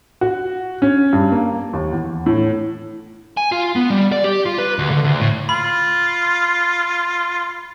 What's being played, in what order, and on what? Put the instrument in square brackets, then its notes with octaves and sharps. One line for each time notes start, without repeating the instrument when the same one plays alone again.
[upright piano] F#4
C#4
G2
A#3
D#2
E2
A2
[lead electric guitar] G#5
F4
B3
G3
D5
G4
F4
B4
D2
D3
D2
A2
[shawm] F4 [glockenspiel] B5